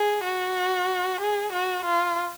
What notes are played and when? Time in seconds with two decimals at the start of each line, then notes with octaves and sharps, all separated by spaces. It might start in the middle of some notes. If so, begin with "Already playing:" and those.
Already playing: G#4
0.24 F#4
1.21 G#4
1.53 F#4
1.85 F4